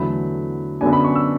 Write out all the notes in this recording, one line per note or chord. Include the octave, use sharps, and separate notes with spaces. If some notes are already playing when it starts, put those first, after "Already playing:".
Already playing: E2 D3 F#3 A3 B5
F#2 D3 F#3 B3 D4 G#5
B5
C#6
E6